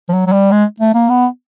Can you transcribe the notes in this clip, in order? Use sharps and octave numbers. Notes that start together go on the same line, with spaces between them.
F3
F#3
F#3
G3
G#3
A3
A#3
B3